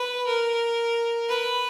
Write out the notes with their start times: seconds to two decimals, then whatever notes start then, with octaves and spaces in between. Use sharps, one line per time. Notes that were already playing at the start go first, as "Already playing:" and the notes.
Already playing: B4
0.27 A#4
1.29 B4